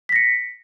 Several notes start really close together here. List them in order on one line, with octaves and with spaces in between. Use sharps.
B6 A#6 C#7